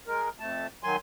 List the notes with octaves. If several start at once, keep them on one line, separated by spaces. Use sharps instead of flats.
G#3 A#4
F2 A3 A5
D#3 F#3 G#5 C6